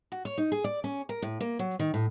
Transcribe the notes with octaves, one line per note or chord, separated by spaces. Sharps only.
F#4
C#5
D#4
G#4
D5
C#4
A#4
A2
A#3
F#3
D#3
A2